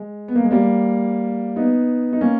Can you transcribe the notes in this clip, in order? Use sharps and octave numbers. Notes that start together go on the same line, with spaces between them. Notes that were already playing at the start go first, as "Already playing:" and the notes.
Already playing: G#3
B3
A#3
G#3
G3 A#3
B3 D#4
D#4
A#3 C#4